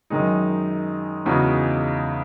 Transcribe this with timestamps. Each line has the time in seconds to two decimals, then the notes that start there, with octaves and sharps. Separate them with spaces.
0.10 F#2 D#3 G#3 D#4
1.25 E2 C#3 G#3 D#4 F#4